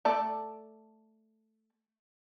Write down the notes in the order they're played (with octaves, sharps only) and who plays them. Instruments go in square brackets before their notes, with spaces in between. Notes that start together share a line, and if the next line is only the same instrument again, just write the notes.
[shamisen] A3 A4 D5